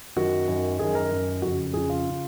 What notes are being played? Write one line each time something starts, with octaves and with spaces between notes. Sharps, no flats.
F#2 D#3 F#4
F#2 D#3
F#2 D#3 G#4
A#4
F#2 D#3
F2 C#3 F#4
F2 C#3 G#4
F4
C#3